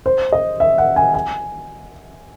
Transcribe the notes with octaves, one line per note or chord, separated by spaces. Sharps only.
C5
D#5
E5
F#5
G#5
G#5